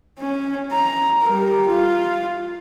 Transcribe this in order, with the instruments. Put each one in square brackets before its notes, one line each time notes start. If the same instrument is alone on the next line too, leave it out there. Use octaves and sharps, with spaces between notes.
[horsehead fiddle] C#4
A#5
G3 A#4
F4